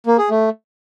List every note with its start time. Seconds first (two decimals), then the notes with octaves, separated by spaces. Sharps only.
0.06 A#3
0.18 G#4
0.30 A3